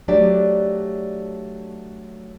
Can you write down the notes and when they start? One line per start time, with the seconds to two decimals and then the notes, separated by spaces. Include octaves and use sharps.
0.08 F#3 A3 D4 G4 D5